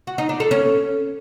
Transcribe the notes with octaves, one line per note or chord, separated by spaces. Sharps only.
F#4
D#4
D4
A4
C#4